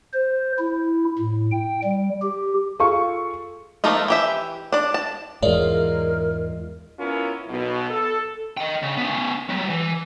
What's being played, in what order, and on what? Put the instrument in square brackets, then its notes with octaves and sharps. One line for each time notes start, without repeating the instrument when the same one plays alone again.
[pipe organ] C5
E4
A2
G5
G3
G4
[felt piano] F4 G#4 A4 F5 C#6
[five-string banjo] F3 A3 A#3 D#4 F4
E3 G4 E5
D4 D5
A5
[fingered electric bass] E2 G#2 [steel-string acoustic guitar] G#3 F4 [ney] A#4 [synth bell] C#5 D5 E5
[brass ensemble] B3 C#4 E4 F4 A#4
B1 B2
A4
[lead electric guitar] D#5 G5
C#3
B3 C#4
F#3 G3
E3